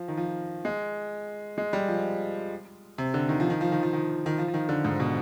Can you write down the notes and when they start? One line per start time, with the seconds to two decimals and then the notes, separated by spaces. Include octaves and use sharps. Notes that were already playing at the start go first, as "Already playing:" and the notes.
Already playing: F3
0.08 D#3
0.17 F3
0.65 G#3
1.58 G#3
1.73 G3
1.88 F3
2.98 C3
3.14 D3
3.29 D#3
3.40 F3
3.50 D#3
3.61 F3
3.72 D#3
3.83 F3
3.93 D#3
4.26 D#3
4.38 F3
4.48 F3
4.54 D#3
4.69 D3
4.85 G#2
5.00 B2